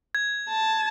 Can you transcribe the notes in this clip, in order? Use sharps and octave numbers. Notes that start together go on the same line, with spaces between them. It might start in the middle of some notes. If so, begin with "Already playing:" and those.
G#6
A5